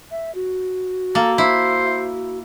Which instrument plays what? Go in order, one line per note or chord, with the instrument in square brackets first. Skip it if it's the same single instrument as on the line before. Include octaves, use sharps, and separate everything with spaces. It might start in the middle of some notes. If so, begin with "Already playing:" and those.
[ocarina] E5
F#4
[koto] A#3 [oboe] A4
[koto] E4 [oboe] C5